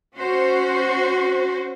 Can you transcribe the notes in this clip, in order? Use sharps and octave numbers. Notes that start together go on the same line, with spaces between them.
C#4 F#4 C5